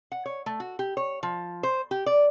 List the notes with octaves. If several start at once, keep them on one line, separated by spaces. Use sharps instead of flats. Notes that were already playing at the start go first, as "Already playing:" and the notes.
F#5
C#5
A3
F#4
G4
C#5
F3
C5
G4
D5